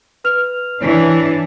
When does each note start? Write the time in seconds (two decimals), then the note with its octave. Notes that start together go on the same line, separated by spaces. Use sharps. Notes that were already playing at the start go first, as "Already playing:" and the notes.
0.24 B4 F6 F7
0.82 E3 D4 C#5